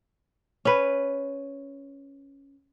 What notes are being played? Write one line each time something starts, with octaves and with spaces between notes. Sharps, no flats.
C#4 B4